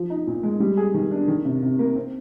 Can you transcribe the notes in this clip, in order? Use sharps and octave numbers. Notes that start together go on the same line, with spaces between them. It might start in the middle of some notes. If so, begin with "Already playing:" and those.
Already playing: F3
D#4
A#2
G#3
G3
G#4
D#3
D4
D#3
C3
C3
A#3
C4